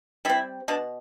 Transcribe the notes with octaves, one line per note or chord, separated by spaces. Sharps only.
G3 C4 E4
B2 D4